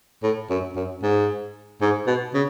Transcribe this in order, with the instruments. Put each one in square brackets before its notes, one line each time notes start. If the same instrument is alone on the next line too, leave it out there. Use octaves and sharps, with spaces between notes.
[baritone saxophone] A2
F#2
F#2
G#2
G#2
B2
C#3